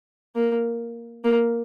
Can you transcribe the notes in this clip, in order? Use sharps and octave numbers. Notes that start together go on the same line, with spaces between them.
A#3
A#3